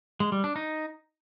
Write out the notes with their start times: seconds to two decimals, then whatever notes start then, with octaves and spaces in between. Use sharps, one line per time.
0.20 G#3
0.32 G3
0.44 D4
0.56 D#4